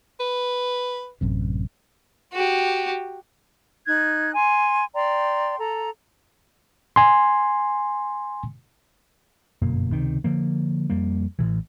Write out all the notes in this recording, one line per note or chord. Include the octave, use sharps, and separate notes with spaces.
B4
A1 F#2 C3
F#4 G4
D#4 F#6 G#6
G#5 C6
D5 G5 A#5 C6
A4 A#5
G#5 C6
G1 F#2 B2 A#3
C#2 C3 D#3
D3 F3 A#3
F2 G3 A#3
A1 A2 C3 E3